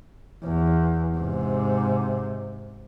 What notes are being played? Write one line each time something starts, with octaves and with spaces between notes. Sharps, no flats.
E2
G#2 C3